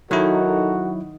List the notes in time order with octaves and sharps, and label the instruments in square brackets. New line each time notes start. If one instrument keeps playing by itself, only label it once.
[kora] D#3 [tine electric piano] F#3 E4 [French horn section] D#4 A4 A#4 [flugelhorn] F#4